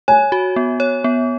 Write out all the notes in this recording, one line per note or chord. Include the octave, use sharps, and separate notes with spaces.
C#5 G#5
F#4
B3
C#5
B3